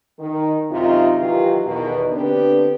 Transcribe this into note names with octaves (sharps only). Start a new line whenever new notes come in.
D#3
F#2 C3 D#4 F4
D#3 E3 F#3 F4 G4
E2 B2 D#3
D3 B3 C4 D4 G4 B4